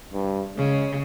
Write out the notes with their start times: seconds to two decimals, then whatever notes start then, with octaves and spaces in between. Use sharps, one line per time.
0.14 G2
0.57 C#3 G#3